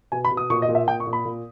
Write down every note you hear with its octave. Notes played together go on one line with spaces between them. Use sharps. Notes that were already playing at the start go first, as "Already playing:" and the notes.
B2 G#5
B5
B2
D#6
A#2 C#6
D#5
A#2
E5
A#2 G5
C#6
A#2
B5
A#2